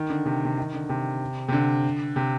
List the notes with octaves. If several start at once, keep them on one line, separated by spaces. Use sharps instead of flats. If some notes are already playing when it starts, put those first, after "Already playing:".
Already playing: D#3
D3
C3
C3
D#3
D3
C3
C3
D3
C3